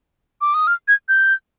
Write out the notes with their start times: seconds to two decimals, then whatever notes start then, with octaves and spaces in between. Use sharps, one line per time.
0.41 D6
0.54 D#6
0.67 F6
0.88 G#6
1.09 G6